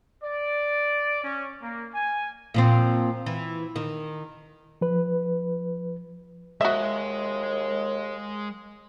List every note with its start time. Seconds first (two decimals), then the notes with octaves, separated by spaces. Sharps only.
0.23 D5
1.22 C#4
1.62 A#3
1.94 G#5
2.54 A#2 F3 C4
3.26 E3
3.76 D#3
4.81 F3 B4
6.61 D#2 G#3 F#4 D#5 E5